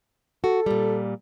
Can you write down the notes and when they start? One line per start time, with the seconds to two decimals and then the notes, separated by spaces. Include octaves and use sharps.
0.44 F#4 A4
0.66 A#2 G3